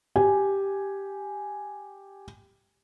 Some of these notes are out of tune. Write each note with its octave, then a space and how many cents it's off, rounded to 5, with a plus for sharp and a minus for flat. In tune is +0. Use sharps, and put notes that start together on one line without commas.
G4 +0 G#5 +0